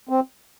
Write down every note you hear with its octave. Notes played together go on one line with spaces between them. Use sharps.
C4